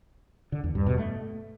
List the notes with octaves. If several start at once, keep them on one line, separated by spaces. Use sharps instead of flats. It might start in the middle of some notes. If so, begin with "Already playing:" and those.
D3
E2
G2
B2
A3